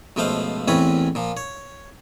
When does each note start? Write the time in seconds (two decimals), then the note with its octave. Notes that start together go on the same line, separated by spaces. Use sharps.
0.16 C#2 B2 F3 A3 C5 F5
0.68 A1 E2 C4 C#4 B4 C#5
1.15 A#2 F3
1.37 C#5